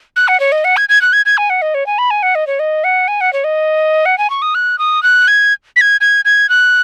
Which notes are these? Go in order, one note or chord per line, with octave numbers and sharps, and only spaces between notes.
F#6
F#5
C#5
D#5
F#5
G#6
G#6
F#6
G#6
G#6
G#5
F#5
D#5
C#5
G#5
B5
G#5
F#5
D#5
C#5
D#5
F#5
G#5
F#5
C#5
D#5
F#5
G#5
C#6
D#6
F#6
D#6
F#6
G#6
B6
G#6
G#6
G#6
F#6